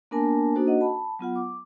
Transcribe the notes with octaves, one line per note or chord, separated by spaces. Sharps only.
A#3 B3 D4 A#4 G#5 A5
A#3 D4 D#4 F#4 A4 C5
F#4 D#5 F#5
A5 B5
F#3 B3 F4 F#5
D6